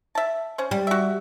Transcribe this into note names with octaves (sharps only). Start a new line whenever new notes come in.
E5 A5
C#4 C5
G3
F#4 E5